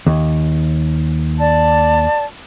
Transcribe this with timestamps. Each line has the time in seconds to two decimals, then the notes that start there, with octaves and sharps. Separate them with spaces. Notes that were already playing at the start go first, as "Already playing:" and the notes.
0.06 D#2
1.39 D5 A5